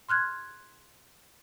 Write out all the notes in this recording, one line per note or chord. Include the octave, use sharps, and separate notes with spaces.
C6 F6 F#6 G#6